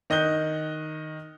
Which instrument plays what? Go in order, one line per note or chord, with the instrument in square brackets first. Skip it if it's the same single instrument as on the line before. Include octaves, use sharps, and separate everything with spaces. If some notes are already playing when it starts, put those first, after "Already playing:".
[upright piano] D#3 D#5 F#6 G6 G7